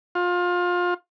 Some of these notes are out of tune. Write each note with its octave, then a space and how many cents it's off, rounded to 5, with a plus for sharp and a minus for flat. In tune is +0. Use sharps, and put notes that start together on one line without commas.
F4 +25